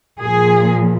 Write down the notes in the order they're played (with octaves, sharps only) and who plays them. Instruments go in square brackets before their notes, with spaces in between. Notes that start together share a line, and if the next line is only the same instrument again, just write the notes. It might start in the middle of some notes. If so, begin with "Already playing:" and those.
[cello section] A#2 F3 G#4